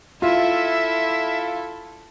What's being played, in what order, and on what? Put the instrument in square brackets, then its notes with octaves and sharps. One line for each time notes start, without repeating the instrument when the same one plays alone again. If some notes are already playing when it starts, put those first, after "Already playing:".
[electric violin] E4 A4 [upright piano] F4 [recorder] E5